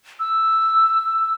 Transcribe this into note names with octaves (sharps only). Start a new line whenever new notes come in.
E6